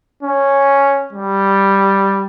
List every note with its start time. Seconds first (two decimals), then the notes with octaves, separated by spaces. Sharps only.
0.23 C#4
1.13 G3